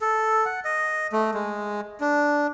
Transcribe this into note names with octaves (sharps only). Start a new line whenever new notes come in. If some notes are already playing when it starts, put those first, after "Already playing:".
A4
F#5
D#5
A3
G#3
D4